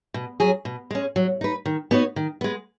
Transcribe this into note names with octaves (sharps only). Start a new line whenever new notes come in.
B2
F#3 C#4 G#4
B2
G#3 C#4
F#3
D#4 B4
D#3
B3 D#4 F#4 C#5
D#3
G#3 B3